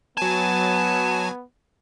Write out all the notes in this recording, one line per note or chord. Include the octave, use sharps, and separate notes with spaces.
F#3 B3 G#5 A5